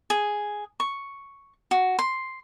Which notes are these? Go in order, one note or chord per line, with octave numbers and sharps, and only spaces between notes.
G#4
C#6
F#4
C6